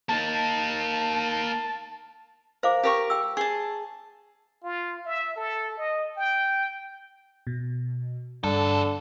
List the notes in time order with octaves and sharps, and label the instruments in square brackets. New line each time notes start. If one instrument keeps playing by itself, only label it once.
[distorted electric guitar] A#3 D#4 [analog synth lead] A5
[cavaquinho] A#4 [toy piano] C5 F5 D6
[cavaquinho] G4 A#4 C#6
[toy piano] G5 E6
[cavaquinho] G#4 A5 [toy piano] C#6
[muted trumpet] F4
E5
A4
D#5
G5
[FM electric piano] B2
[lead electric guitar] E2 A4 [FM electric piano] G2 [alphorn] D3